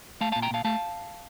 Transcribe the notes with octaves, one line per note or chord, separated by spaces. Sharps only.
A3 F5 A5
A#2 F5 A5
G5 A#5
A#2 F5 A5
A3 F5 A5